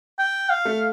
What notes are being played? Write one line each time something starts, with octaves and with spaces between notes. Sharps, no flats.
G5
F5
A3